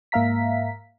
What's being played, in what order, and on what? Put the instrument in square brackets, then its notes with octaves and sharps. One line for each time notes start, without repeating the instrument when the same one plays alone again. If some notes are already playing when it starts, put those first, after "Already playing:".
[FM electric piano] G#2 A#3 E5 F5 A#5 B6